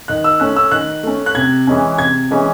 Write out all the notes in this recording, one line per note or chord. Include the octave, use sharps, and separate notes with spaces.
D#3 F#6
E6
A3 C#4 F#6
E6
D#3 F#6
A3 C#4
F#6
C3 G#6
E3 G#3 C#4
C3 G#6
E3 G#3 C#4